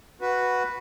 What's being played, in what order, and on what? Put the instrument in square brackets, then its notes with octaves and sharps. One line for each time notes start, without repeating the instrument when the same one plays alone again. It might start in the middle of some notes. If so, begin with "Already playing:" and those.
[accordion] F#4 B4